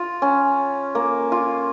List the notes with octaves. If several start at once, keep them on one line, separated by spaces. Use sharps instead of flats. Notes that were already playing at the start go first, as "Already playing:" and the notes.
Already playing: F4
C#4
A#3
F4